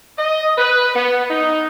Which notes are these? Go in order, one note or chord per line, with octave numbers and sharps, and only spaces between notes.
D#5
B4
B3
D#4